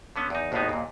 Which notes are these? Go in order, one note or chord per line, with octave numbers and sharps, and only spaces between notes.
D3 B3 C#4
E2 D#4
G#1 D#2 A2 G#3 B3 D#4
D#2 A#2